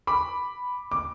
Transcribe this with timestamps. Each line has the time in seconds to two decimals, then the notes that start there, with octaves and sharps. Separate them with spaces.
0.07 B5 D6
0.92 D6